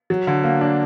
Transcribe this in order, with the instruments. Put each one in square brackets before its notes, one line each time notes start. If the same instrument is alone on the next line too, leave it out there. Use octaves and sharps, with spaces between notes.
[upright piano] F#3
D3
A#3
D4